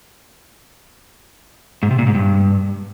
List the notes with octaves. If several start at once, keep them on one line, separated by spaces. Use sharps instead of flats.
G#2
C3
A#2
G#2
G2